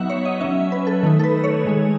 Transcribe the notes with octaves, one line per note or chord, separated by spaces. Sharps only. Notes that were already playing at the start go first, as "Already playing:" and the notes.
Already playing: F#3 B3 D#4 E5 F#5
C#5
D#5
F#3 C#4 E5
B4
A4
D#3 A3 D#4
A4
B4
C#5
D#3 G#3 D#4